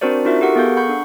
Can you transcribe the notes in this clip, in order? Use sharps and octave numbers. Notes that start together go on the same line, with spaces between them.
C4 D4 F#4 A#4 C5 D5
D#4 F4 F#4 A#4 E5
G4 A4 A#4 F#5 C#6
B3 G#4 A4 F5 G6
F#5 B5 C#6 G6
D4